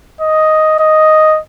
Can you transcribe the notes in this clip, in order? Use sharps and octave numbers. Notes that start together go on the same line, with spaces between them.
D#5
D#5